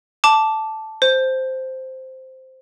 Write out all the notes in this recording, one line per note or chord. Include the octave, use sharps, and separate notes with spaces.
A5 D6
C5